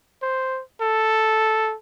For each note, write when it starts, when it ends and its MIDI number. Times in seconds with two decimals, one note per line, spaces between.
0.22 0.62 72
0.81 1.75 69